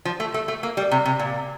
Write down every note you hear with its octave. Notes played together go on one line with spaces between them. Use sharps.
F3
A3
A3
A3
A#3
G3
C3
C3
A#2